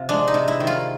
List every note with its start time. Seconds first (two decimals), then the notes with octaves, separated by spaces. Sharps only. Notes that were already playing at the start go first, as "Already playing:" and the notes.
Already playing: C3 F4
0.09 G#3 D4
0.28 D#4
0.34 C3
0.48 E4
0.60 D#3
0.67 F4